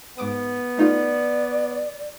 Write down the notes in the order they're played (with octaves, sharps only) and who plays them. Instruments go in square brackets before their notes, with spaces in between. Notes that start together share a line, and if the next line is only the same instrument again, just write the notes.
[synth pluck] G#2 D6 D#6 [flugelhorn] B3
[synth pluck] A3 D#4 F4 [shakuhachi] D5